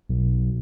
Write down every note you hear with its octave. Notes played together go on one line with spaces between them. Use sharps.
B1